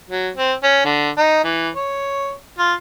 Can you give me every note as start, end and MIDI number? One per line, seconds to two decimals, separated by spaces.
0.10 0.30 54
0.37 0.54 60
0.63 0.82 61
0.85 1.10 50
1.18 1.43 63
1.44 1.69 52
1.75 2.33 73
2.59 2.74 65